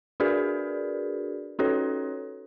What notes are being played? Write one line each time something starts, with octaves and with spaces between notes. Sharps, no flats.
D4 F#4 G#4 A#4 B4 D5
C#4 D#4 F#4 A4 B4 C#5